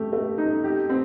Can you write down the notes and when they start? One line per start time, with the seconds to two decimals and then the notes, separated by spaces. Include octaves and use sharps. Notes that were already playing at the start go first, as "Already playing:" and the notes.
Already playing: A3 G4
0.13 A3
0.38 D#4
0.64 G4
0.90 C4